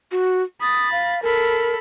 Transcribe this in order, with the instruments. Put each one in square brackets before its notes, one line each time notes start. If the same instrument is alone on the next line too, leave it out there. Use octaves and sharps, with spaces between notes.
[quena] F#4
[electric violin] B5 A6 [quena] D#6
[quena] F5
[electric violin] A4 B5 [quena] A#4